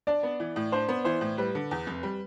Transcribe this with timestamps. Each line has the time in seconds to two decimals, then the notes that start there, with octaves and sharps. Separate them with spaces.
0.07 D4 D5
0.23 B3
0.40 E3
0.56 A2
0.72 D4 C5
0.88 B3
1.05 E3 C5
1.21 A2
1.37 G3 B4
1.55 D3
1.71 E2
1.87 F1
2.03 G3